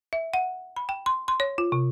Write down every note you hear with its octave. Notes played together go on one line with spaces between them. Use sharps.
E5
F#5
B5
G5
C6
C6
C#5
F4
C3